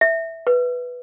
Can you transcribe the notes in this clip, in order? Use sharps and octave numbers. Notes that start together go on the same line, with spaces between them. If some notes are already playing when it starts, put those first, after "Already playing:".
E5
B4